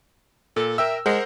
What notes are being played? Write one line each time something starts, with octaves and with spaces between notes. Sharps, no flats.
A#2 A4
A#4 E5 G5 E6
G#3 A#4 C5 F#5